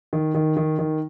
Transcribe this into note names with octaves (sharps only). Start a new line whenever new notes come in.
D#3
D#3
D#3
D#3